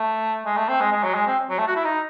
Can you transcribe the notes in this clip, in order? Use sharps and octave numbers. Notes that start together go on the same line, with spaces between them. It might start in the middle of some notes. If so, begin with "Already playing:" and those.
Already playing: A3
G#3
A3
C4
G#3
G#3
F#3
G#3
C4
F#3
A3
F#4
E4
D#4